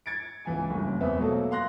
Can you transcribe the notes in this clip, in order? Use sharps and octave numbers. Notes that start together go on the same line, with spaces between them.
G#6 A6 C#7 D7
C#2 E3 G#5
F#1 G2
E2 B3 C4 B4 E5
B2 F#3 A3 A#3 A4
F5 C6 F#6 A#6